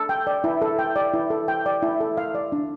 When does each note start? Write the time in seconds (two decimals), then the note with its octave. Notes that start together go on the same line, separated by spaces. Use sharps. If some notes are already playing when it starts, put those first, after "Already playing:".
Already playing: A4
0.09 G5
0.27 D5
0.44 E4
0.62 A4
0.79 G5
0.96 D5
1.14 E4
1.30 A4
1.48 G5
1.66 D5
1.82 E4
2.00 A4
2.17 F5
2.35 D5
2.52 D4